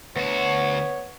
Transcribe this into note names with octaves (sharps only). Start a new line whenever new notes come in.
D2 B3 F#4 C#5